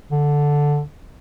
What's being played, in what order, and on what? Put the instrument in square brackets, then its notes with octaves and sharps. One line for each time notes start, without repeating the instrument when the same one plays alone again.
[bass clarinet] D3